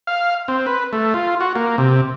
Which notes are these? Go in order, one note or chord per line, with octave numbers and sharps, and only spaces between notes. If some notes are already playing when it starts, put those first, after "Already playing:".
F5
C4
B4
A3
F4
F#4
A#3
C3